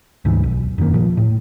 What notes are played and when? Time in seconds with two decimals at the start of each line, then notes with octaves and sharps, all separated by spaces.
0.25 D2 G#2 E3
0.44 B1
0.78 E1 F#2 D#3 A#3
0.94 A#2 F3
1.17 A2